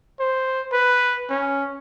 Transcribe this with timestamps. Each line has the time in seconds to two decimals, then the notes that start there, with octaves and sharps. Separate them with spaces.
0.20 C5
0.72 B4
1.30 C#4